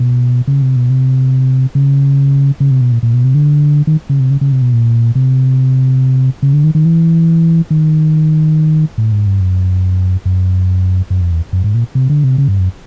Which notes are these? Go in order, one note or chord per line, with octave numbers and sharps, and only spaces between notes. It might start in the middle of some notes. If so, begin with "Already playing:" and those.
Already playing: B2
C#3
C3
B2
C3
C#3
C#3
C3
B2
A#2
A#2
B2
C3
D3
D#3
C#3
C3
C#3
C#3
C3
B2
A#2
C3
C#3
D3
D#3
D#3
E3
D#3
A2
G#2
G2
F#2
F#2
F#2
F2
E2
F#2
G#2
A#2
C3
D3
C3
C#3
G2
F#2